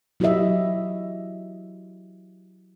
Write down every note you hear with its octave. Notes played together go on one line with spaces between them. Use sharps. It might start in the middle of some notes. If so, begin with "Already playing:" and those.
F#3 E4 F#4 G4 D#5 E5